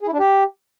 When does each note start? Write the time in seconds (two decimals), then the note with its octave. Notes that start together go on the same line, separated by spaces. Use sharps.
0.01 G#4
0.07 E4
0.13 D4
0.19 G4